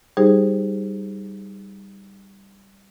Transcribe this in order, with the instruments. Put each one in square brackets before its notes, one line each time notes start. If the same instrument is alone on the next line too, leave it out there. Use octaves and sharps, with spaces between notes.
[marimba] G3 D#4 G4 G#4 C5